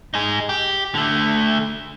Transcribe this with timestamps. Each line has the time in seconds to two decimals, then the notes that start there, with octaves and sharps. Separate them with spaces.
0.14 D#4 G#4
0.49 G4
0.95 D3 A3